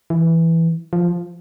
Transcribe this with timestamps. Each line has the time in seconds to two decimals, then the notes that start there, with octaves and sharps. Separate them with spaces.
0.10 E3
0.93 F3